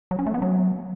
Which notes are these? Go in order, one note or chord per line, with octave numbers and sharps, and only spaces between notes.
F#3
C#4
A3
B3
F#3